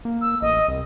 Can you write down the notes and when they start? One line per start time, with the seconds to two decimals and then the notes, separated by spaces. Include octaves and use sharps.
0.05 A#3
0.21 E6
0.42 A1 D#5
0.68 C2